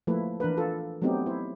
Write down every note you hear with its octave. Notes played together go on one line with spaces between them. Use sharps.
F3 A3 A#3 E4 B4
E3 D4 A#4 B4
F4 A4
F#3 A3 B3 C4 D#4 G4
E4 C5